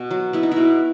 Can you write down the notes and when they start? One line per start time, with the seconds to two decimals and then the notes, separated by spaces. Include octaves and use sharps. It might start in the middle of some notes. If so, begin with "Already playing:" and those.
Already playing: B2
0.11 F#3
0.33 B3 E4
0.43 D#4
0.52 B2 E4